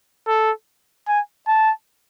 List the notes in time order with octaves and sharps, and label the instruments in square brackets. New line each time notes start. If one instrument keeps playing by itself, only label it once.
[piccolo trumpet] A4
G#5
A5